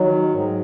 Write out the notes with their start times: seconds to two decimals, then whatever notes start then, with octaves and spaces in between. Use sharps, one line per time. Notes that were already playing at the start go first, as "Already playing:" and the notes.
Already playing: D#3 F#3
0.33 G#2